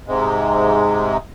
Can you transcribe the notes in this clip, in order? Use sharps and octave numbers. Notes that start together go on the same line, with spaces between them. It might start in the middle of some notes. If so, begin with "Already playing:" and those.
G#2 C3 G#3